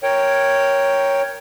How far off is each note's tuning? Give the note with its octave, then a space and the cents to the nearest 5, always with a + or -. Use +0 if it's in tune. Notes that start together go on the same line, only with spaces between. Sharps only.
A#4 +0 C#5 +0 G5 +0